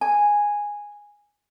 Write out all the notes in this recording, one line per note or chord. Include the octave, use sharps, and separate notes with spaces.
G#5